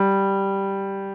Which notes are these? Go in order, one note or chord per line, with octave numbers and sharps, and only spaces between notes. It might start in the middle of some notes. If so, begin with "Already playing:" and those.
Already playing: G3